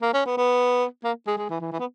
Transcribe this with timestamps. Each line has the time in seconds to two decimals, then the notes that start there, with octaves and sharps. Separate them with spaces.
0.02 A#3
0.14 C#4
0.26 B3
0.37 B3
1.04 A#3
1.27 G#3
1.37 G#3
1.50 E3
1.61 E3
1.72 E3
1.80 B3